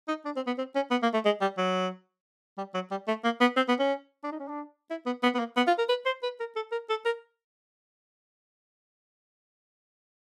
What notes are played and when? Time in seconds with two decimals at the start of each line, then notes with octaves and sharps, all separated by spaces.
0.08 D#4
0.25 D4
0.36 C4
0.47 B3
0.58 C4
0.75 C#4
0.91 B3
1.03 A#3
1.13 A3
1.25 G#3
1.41 G3
1.58 F#3
2.58 G3
2.74 F#3
2.91 G3
3.08 A3
3.24 A#3
3.41 B3
3.56 C4
3.68 B3
3.79 C#4
4.23 D4
4.32 D#4
4.40 C#4
4.48 D4
4.90 E4
5.06 B3
5.23 B3
5.35 B3
5.39 A#3
5.57 B3
5.67 F4
5.78 A#4
5.89 B4
6.06 C5
6.23 B4
6.40 A#4
6.56 A4
6.72 A#4
6.90 A4
7.06 A#4